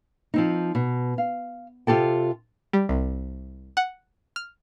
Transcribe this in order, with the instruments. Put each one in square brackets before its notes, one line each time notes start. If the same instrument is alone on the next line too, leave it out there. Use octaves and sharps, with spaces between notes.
[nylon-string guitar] F3 C4 D#4
B2
F5
C3 F4 G4 A4 G5
[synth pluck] G3
C2
F#5
F6